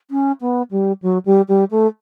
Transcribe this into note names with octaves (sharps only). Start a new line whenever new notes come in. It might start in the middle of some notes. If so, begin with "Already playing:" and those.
C#4
B3
G3
F#3
G3
G3
A3